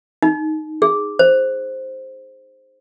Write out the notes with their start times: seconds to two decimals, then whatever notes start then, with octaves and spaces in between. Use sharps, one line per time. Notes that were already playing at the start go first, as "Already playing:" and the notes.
0.22 D#4
0.82 G#4
1.19 C5